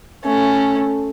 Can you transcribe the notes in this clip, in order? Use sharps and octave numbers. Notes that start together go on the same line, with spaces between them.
A3 C#4